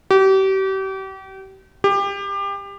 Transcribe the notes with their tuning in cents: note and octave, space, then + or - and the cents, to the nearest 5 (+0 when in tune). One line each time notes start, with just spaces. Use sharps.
G4 -35
G4 +25